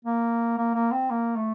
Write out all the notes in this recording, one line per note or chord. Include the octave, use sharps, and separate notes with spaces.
A#3
A#3
A#3
C4
A#3
A3